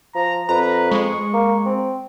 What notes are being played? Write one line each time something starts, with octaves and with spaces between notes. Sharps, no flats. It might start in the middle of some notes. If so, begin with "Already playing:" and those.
F3 A#5
F2 B4 A#5
G#3 C#6
A#3
C4